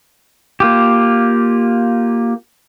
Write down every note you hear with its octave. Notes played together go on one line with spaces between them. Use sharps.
A#3 F4 G4